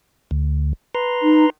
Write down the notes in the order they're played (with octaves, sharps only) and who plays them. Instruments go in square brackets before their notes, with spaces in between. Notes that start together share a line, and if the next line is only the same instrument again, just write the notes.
[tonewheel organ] D2
B4 A#5 C6
[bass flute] D#4